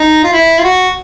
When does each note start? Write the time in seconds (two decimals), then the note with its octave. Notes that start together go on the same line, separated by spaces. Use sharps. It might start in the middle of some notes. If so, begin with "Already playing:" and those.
Already playing: D#4
0.24 F4
0.33 E4
0.59 F4
0.64 F#4